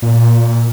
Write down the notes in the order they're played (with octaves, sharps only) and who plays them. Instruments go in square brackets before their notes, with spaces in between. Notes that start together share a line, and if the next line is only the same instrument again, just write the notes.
[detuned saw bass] A#2